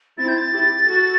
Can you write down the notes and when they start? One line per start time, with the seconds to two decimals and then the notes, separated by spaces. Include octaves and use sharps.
0.17 C4 E4 A6
0.28 G6
0.37 A6
0.52 E4 G4
0.87 F#4 A4